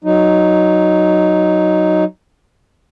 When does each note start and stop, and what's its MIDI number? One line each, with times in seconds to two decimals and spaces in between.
0.04 2.04 54
0.04 2.04 63